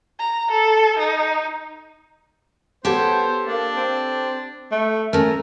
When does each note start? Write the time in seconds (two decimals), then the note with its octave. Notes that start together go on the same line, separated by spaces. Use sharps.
0.19 A#5
0.51 A4
0.98 D#4
2.85 B3 G4 A4 C5 C#5
3.47 A#3 D4
3.76 C4
4.72 A3
5.13 A3 C#4 A#4 A#5